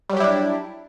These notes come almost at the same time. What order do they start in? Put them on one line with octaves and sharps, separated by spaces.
G3 F#3 G4 E4 D4